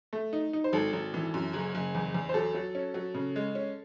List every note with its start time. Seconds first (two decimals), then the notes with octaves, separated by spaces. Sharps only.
0.13 A3
0.33 D#4
0.53 D#4
0.64 C5
0.73 G#1 A4
0.93 G#1
1.14 E3
1.34 F#2
1.53 F#1 G#4
1.75 F#1
1.95 E2
2.14 E2
2.29 C5
2.34 F#3 A4
2.54 F#3
2.75 C#4
2.94 F#3
3.14 C#3
3.36 G#3
3.55 C#4